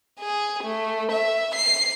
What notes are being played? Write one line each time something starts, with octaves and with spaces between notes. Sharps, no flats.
G#4
A3
E5
C7